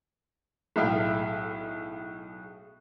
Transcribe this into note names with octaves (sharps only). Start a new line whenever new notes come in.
B1 A2 G#3 E5 F5 G5